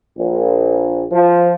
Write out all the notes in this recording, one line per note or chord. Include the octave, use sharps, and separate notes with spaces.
A#1
F3